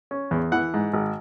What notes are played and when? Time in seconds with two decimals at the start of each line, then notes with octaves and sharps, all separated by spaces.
0.11 C#4
0.31 E2
0.52 E3 F#5
0.74 G#2
0.94 G#1